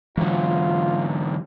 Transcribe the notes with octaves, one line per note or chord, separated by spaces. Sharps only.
G#2 D3 E3 F#3 F4